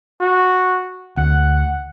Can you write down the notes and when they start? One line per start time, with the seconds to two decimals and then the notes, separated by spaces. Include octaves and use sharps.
0.21 F#4
1.17 D2 F#5